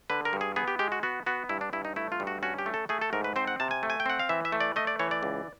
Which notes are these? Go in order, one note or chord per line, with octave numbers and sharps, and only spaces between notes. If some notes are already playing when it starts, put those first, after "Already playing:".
D3 B4
A#4
G2
G#4
B3 G#4
G4
G#3 G4
F#4
B3 F#4
B3 F#4
G2 E4
D4
G2 E4
D#4
A3 E4
F4
G2
F#4
C#4 F#4
G4
A3
A4
A3 G#4
A4
G#2 A#4
B4
C4 C5
F#5
C3 A5
G#5
A3
G#5
G5
C4 F#5
F5
E3 E5
E5
A3
D5
A3 D#5
D5
E3 C#5
D5
C#2